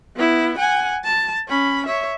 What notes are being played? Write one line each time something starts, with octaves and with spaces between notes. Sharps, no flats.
B3 E4
F#5 G#5
A5
C#4 B5
C#5 E5